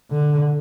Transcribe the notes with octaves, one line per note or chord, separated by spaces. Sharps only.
D3